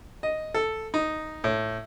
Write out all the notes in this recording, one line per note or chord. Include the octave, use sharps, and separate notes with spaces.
D#5
A4
D#4
A2